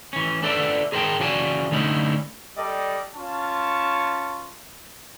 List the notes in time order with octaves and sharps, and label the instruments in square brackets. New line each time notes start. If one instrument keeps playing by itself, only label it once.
[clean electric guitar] E3 C#4
D4 A4 B4 D5 E5
G#4 A#4 C5 D5 G5 A5
C#3 E3 F#4 D5 G#5 A5
D3 A3 C#4 D#4 E4
[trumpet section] G3 A4 D5 D#5
C#4 F4 A5 C#6